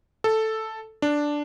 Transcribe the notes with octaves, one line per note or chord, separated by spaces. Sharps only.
A4
D4